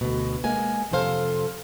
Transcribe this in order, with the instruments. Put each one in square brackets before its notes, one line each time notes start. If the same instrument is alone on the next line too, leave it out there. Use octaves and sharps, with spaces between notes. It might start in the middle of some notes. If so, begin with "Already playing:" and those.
[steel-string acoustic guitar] D2 B2
G#3 A#3 G#5
F2 C3 A4 C5 F5